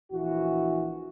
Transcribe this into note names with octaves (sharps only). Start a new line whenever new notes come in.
A#1 E3 F#4